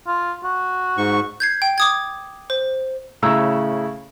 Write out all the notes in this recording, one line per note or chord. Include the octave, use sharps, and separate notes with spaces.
F4
F#4
G#2 C#6
G6 G#6 C7
G5
D6 D#6 G#6
C5
A2 C#3 E4 A#5 E6